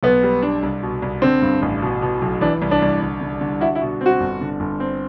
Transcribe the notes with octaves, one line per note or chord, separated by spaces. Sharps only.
B1 B3
G3
D4
C2
B2
C2
D3 C4
G2
A1
B2
B2
B1
E3 D4
C2
D4
C2
D3
D3
D3
E4 F#4
E4
B2
C4 F#4
G1
D3
G1
C4